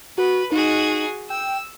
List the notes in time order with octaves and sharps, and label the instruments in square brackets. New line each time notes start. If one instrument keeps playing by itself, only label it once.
[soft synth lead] F#4 [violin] B4
[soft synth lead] D#4 [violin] F#4 G#4
[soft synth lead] G5 [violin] E6